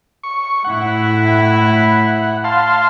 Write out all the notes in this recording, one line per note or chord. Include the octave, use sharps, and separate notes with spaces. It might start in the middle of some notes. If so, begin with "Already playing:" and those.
C#6
A2 E4 F#5
F5 A5 C6